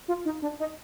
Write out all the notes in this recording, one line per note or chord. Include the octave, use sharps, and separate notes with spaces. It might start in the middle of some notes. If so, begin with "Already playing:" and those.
F4
D#4
D4
D#4